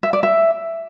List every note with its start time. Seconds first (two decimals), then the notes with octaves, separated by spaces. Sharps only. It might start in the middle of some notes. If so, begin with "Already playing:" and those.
0.03 E5
0.13 D5
0.23 E5